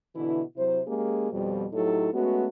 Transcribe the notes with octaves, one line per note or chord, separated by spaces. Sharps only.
B2 D3 E3 E4
C3 F#3 E4 C5
G#3 A#3 C#4 G4 G#4
F2 B2 F3 G3
A2 F#3 D#4 E4 G4 A4
G#3 A3 B3 C#4 F#4